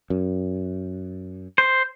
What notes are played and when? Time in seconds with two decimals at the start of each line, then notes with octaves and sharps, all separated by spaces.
0.10 F#2
1.58 C5